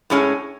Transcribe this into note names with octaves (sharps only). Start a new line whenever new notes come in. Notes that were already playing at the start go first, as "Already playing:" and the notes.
A2 G#3 C#4